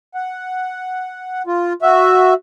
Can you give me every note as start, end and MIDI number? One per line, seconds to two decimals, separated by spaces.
0.15 1.42 78
1.47 1.73 65
1.82 2.34 66
1.82 2.34 76